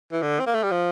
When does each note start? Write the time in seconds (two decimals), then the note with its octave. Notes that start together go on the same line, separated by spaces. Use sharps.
0.12 E3
0.22 D3
0.40 C4
0.47 A#3
0.55 A3
0.64 G3
0.71 F3